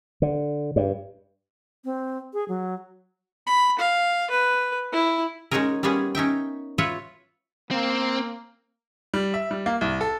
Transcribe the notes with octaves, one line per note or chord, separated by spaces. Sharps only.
D3
G2
C4
G#4
F#3
B5
F5
B4
E4
G#3 C#4 D#4 F#4 G#4 A#4
G3 G#3 A#3 B3 C#4 G#4
C#4 D#4 E5 G5
F4 F#4 B4 C#5 E5 F#5
A#3 C4
G3
E5
G3
A#3
C2
A4